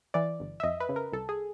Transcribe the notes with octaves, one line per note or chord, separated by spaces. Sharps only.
E3 D5
G1
E5
F2 D#5
B4
C#3
A#4
C2 A4
G#4